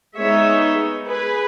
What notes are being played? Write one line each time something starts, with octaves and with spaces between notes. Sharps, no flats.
G#3 B3 D#4 C#5 E5
G#4 B4